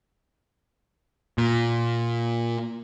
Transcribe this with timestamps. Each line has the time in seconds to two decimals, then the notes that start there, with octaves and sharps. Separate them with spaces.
1.38 A#2